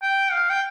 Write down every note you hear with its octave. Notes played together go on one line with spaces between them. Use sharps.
G5
F5
G5